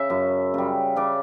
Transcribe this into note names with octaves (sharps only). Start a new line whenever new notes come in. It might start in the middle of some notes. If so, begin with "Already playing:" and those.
Already playing: C#3 E5
F#2
C#3 G3
C#3 D5